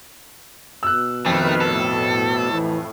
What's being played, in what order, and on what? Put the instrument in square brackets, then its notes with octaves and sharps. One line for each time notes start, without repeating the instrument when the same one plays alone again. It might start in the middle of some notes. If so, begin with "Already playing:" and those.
[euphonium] B2 [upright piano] E6 F#6
[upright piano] F2 [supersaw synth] D#3 B4 F6 [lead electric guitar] A3
[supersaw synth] A2 [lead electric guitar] A4
[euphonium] E3